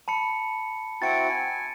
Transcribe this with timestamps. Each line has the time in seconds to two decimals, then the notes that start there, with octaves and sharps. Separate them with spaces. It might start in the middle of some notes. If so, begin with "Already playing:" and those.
0.08 A5 B5 C#7
1.02 C4 E4 F#4 A6 C#7 D7
1.29 G#5